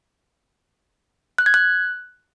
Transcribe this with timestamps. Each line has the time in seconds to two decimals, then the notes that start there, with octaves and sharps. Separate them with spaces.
1.38 F#6
1.46 G#6
1.54 F#6